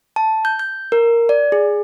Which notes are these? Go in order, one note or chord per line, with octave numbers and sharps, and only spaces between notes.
A5
G6
G6
A#4
D5
G#4